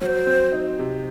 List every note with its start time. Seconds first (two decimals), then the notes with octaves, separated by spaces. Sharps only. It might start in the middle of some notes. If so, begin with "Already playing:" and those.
0.01 F#3 C5 C#5
0.27 C4
0.52 D#4
0.79 C3